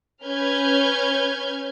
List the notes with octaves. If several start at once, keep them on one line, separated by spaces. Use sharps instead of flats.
C#4 B4 F6 G6 G#6